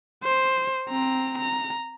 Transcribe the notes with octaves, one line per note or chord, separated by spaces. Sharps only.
C5
C4 A#5
A#5